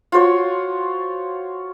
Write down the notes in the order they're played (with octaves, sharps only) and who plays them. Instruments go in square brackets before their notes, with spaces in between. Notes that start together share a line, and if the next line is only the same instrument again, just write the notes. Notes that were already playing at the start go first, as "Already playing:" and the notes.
[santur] F4 F#4 C5 C#5